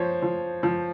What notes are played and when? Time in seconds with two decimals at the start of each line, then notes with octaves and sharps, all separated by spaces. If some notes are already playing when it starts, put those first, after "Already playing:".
Already playing: F3 C5 C#5
0.22 F3
0.63 F3